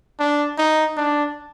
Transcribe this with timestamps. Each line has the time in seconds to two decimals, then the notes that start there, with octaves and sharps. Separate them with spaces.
0.20 D4
0.58 D#4
0.97 D4